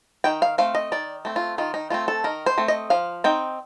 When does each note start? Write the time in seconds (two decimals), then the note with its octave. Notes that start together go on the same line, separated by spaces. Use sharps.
0.24 D#3 G5
0.42 F5
0.58 A3 C4 F5
0.75 D#5
0.92 D#3 D5
1.25 A3 C4
1.36 F4
1.58 D#3 F4
1.74 D#4
1.90 A3 C4 F4
2.08 A4
2.24 D#3 A#4
2.46 C5
2.58 A3 C4
2.68 D#5
2.90 F3 F5
3.24 C4 D#4 G5